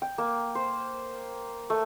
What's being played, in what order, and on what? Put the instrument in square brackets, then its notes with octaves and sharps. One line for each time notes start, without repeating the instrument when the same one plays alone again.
[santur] G5
A#3
C5
A3